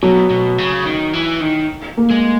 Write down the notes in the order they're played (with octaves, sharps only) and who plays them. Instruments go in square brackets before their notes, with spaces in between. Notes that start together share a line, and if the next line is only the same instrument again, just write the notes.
[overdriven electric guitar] B2 [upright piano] F#3
[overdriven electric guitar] B2
C#3
D#3
E3
D#3
[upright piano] A#3
[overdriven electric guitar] G#3